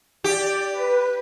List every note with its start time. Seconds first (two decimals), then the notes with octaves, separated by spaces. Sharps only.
0.24 G4 D5
0.72 B4